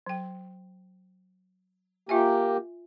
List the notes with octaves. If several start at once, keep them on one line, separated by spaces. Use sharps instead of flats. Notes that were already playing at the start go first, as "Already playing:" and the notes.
F#3 G5
A#3 F4 G4 E5 G#5